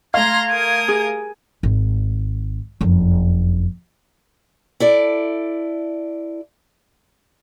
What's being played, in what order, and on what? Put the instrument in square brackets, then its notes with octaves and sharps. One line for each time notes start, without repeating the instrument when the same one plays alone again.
[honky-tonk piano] A3 F5 [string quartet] A#5 C6 A#6 [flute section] G#6
[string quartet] A#4 D#6
[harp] G#4
[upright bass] G#1
F#1 F2
[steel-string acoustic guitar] E4 A4 D5